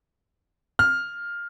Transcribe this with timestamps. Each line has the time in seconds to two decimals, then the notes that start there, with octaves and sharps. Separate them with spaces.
0.79 F6